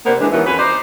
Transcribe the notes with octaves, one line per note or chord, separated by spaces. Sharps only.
C3 A#3 B3 D4 C5
E3 G#3 D4
D#2 D#3 E3 F#3 A#3 B3
F2 C#4 F#4 B4
D#4 C5 D5